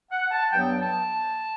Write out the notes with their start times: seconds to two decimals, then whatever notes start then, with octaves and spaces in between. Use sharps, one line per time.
0.11 F#5
0.30 A5
0.51 G2 F#3 B3 G5
0.82 A5